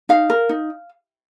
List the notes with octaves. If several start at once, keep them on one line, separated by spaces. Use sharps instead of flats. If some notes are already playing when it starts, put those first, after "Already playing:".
D#4 F5
A#4
D#4